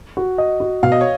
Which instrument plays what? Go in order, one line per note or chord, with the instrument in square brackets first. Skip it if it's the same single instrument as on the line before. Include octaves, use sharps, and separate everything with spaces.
[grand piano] F#4
D#5
F#4
[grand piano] B2 [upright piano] F5
[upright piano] D#5
C#5